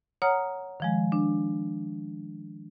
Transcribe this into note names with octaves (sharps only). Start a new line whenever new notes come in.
C#5 F#5 A#5 D#6 F6
D#3 F3 G#3
D4